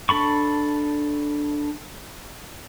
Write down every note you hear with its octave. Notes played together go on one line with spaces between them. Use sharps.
D4 A4 B5 C#6